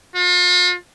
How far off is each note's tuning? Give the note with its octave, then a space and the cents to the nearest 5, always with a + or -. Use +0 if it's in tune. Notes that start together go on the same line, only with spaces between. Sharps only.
F4 +40